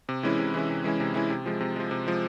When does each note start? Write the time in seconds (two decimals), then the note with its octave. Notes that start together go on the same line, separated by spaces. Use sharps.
0.09 C3
0.23 E3 G#3 C#4 E4
0.39 C3
0.54 E3 G#3 C#4 E4
0.70 C3
0.84 E3 G#3 C#4 E4
1.00 C3
1.14 E3 G#3 C#4 E4
1.30 C3
1.46 F3 G#3
1.60 C3
1.76 F3 G#3
1.91 C3
2.07 F3 G#3